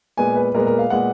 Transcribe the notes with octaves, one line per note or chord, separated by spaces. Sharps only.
A#2 G#3 B3 G#5
B4
A#2 G#3 B3 A#4
A#4
F5
A#2 G#3 B3 F#5